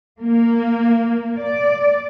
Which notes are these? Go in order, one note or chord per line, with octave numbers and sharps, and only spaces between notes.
A#3
D5